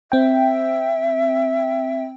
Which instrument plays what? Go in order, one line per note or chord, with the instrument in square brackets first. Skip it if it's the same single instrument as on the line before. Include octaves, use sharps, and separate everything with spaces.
[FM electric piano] C4 G5 [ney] E5